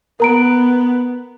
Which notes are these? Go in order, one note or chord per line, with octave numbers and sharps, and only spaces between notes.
B3 A#4 A#5 D7